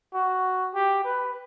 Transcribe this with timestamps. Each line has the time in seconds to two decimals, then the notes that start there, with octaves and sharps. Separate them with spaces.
0.13 F#4
0.74 G4
1.04 B4